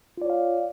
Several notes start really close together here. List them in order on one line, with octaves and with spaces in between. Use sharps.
F4 D5 C#5 F5